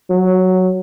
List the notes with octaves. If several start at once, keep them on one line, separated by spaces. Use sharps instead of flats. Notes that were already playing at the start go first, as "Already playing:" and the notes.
F#3